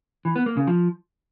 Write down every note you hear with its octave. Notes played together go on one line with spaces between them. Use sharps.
E3
B3
A#3
C#3
F3